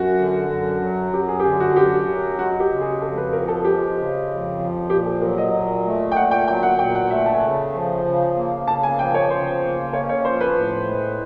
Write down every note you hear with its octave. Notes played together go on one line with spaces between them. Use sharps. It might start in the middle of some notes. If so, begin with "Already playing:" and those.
Already playing: F#2 F#4
D3
F#2
F#3
F#2 G4
G#4
G4
D3 G#4
F#4
F#2 G4
F#3
G#3 F#4
G4
C#3
G#4
F2 A4
B4
F3 A#4
A4
G#3 G4
C#3
F2
F3
A#2 G4
A4
F#3 A#4
D#5
A#2
A3
G5
A#2 F#5
G5
F#3 G5
F#5
A#2 G5
F#5
A3 E5
A5
G#5
C#3 A5
F3
C#3
A#3
C#3 A5
G#5
F3 G5
C#5
C#3 C5
A#3
C#4 C#5
C#5
F3 C5
B4
A2
G#3